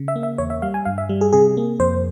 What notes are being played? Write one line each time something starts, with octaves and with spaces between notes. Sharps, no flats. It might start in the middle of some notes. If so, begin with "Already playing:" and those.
Already playing: C#3
E5
A#3
E5
E2 C#5
E5
G3 F5
G#5
G2 F5
E5
G3
G#4
C3 G#4
A#3
F2 C5